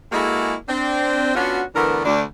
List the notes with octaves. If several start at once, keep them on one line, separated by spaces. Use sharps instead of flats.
G#3 A#3 E4 F#4 G#4 A4
C4 D4
B3 C#4 D4 F4 F#4
D3 E3 A3 B3 D4 A#4
D2 D4